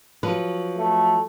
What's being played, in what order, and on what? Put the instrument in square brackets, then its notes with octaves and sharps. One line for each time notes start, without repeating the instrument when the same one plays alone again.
[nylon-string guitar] F3 F#3 B4
[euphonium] A3